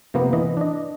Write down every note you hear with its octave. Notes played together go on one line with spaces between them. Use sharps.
C3 F3 A#3 B3
E3 D#5
D4 D#5